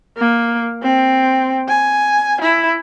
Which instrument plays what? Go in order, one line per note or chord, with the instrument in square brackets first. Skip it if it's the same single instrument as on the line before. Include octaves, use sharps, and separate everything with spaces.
[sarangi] A#3
C4
G#5
E4